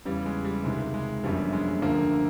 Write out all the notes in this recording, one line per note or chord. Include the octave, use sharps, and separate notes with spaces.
E2 C#3 E3 G3
G#3
G3
C#2 C3 D#3 G#3
G#3
G1 F#2 D3 F3 G3
G#3
D2 D3 F3 A#3